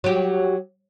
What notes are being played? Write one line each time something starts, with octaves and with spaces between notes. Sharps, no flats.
F#3 G4